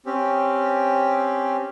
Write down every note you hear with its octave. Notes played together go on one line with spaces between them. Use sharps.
C4 C#4 G4